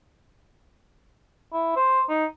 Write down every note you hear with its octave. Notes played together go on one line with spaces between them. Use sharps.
E4
C5
D#4